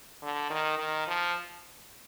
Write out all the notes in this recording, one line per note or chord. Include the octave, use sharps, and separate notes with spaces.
D3
D#3
D#3
F3